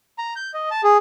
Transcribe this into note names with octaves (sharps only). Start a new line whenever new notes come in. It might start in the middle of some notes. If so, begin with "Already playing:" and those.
A#5
G6
D#5
A5
G#4